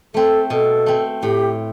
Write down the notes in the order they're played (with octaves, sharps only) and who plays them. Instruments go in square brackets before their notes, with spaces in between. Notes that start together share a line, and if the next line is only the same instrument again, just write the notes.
[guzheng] A3 C4 [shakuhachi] A4
[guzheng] B2 [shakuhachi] A4
[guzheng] A3 C4
[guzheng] A2 [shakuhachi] G4